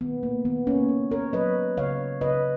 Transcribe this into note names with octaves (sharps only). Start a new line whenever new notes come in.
D#3 B3
A#3
D#3 B3
A#3 C#4
A#3
A#4 C#5
F#3 B4 D#5
C#3 C#5 F5
C#3 B4 D#5